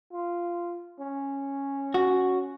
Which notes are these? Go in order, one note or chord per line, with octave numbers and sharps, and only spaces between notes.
F4
C#4
F#4